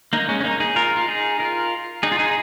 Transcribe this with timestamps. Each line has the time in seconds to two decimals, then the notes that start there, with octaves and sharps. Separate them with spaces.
0.13 A#3 D#4
0.29 G#3 C#4
0.41 C#4
0.44 A#3 D#4
0.60 D#4 G#4
0.76 F4 A#4
0.97 F4
1.08 D#4 G#4
1.40 F4 A#4
2.03 D#4 G#4
2.12 F4
2.19 D#4 G#4